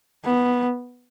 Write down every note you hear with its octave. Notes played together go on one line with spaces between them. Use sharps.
B3